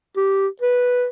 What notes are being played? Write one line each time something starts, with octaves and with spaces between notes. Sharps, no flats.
G4
B4